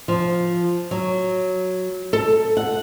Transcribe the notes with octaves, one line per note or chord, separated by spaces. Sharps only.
F3
F#3
A4
F#5